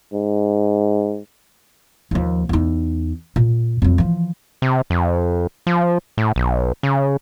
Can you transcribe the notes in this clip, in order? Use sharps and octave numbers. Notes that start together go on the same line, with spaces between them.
G#2
D#2 F3
E2 D#4
A#2
F2 F#3
E3 F3
C3
F2
F3
A2
B1
C#3